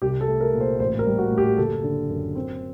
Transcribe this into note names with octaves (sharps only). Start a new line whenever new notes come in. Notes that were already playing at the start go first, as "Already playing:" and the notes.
C2 G4
A4
A3
A#4
A#2
C5
A1 C5
A#4
G3
F#4
A2
G4
F#1 A4
D3
F#2
C4